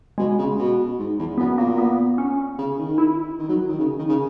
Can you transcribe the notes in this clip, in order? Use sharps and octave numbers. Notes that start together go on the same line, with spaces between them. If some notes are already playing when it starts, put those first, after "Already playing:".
B2 G#3
C#3
B2
G#2
E2
F#2 B3
A#2 A#3
B3
C#4
C#3
D#3
E4
D#3
F#3
D#3
C#3
D#3
C#3